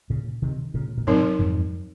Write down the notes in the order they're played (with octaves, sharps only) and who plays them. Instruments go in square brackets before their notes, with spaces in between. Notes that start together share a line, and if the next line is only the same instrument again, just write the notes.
[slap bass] A#2 C#3
C3 D#3
A#2 C#3
A#2
[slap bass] G#2 C3 [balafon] F#3 C4 D#4 A#4 C#5
[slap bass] F2 G#2